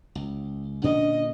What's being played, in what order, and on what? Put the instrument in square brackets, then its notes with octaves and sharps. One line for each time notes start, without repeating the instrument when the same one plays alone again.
[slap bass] C#2
[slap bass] A#2 D3 C#4 [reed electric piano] D4 [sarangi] D#5